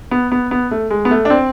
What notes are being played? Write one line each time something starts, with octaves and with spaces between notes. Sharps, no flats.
B3
B3
B3
A3
G#3
B3
A3
D4
C4